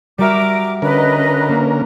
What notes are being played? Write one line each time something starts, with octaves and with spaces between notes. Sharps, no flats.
G3 F#4 A#4 E5 D6
D3 C#4 A#4 B4 D#5
A#3